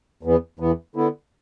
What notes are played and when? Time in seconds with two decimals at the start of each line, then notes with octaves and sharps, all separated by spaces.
0.23 E2 E3 B3
0.59 E2 E3 B3
0.96 D3 B3 E4